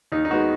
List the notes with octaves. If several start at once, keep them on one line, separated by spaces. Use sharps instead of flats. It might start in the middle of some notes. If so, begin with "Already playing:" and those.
D#2 D#4
D#4
D#3 G#3 B3 F#4